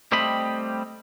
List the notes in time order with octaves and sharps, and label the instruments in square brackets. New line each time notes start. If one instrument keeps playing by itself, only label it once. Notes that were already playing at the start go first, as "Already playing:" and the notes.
[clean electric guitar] G3 A3 C4 G4 D#5 B5